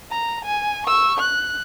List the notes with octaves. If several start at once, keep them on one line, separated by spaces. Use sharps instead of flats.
A#5
G#5
C#6 E6
F#6